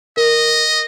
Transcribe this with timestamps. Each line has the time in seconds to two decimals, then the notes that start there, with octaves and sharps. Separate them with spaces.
0.17 A#4 D#5